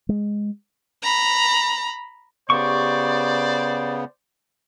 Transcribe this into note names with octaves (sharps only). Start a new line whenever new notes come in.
G#3
A#5 B5
C#3 B3 G4 C5 D5 C#6